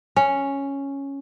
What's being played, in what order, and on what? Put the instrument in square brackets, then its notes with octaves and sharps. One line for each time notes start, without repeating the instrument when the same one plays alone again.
[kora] C#4